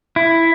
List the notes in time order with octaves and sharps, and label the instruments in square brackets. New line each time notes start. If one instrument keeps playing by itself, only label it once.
[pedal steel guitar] E4